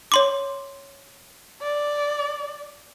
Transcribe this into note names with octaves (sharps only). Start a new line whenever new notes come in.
C#5 C6 D6
D5